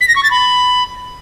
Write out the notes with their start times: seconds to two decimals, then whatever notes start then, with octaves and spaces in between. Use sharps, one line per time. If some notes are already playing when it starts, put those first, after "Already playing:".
0.01 B6
0.08 A#6
0.16 C#6
0.23 A6
0.31 B5